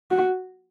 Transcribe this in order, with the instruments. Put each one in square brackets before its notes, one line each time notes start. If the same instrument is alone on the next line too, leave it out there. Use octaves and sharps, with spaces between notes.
[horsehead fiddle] F#4